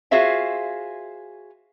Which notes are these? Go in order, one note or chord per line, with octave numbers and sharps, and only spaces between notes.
F4 F#4 G#4 C5 E5 F5